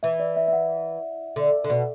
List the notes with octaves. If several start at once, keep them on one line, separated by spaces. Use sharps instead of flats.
E3 E5
D5
E5
E5
F#5
D3
D3
B2